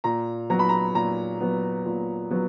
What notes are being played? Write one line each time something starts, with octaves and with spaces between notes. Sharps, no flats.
A#2 A#5
F#3 B3 A#5
B5
A#5
A#2 A#5
F#3 B3
A#2
F#3 B3